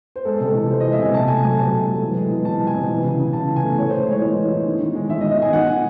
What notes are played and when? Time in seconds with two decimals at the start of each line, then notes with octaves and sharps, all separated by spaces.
0.16 C5
0.25 G#3 A4
0.41 C3
0.47 A4
0.55 E3
0.70 E3 C5
0.80 G#3 D#5
0.92 E5
0.99 C3 G#5
1.14 C3 A5
1.28 A3 G#5
1.43 F#3 G#5
1.58 C3 A5
1.73 A3
1.87 F#3
2.02 E3
2.16 G#3
2.32 E3
2.45 C3 A5
2.61 G#3
2.67 G#5
2.75 C3
2.89 E3
3.04 C#3
3.19 C#3
3.33 C#3 A5
3.48 E3
3.56 G#5
3.64 A3
3.78 A2 C#5
3.89 A2 C5
4.07 G#3 C#5
4.22 E3
4.36 E3
4.51 A2
4.66 D#3
4.80 D#3
4.95 G#3
5.09 D#3 E5
5.21 D#5
5.24 D#3
5.31 D#5
5.38 D#3 G#5
5.53 D#3 F#5
5.66 D#3 G#5